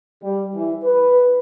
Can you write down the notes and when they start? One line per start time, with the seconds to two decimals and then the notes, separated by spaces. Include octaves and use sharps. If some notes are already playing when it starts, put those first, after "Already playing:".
0.23 G3
0.55 E3
0.84 B4